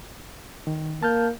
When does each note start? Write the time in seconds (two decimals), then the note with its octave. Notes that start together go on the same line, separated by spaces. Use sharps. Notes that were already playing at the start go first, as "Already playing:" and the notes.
0.67 D#3
1.03 A#3 A5 F6 G6